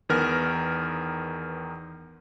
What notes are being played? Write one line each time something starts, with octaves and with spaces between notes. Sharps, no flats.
E2 D#3 B3 A#4 F6